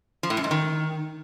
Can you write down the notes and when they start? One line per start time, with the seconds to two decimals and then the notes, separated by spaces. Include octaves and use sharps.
0.23 F3
0.30 A2
0.37 F#2
0.44 G#2
0.51 D#3